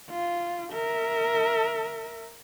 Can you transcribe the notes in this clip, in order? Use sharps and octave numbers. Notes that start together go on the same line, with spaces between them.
F4
A#4 E5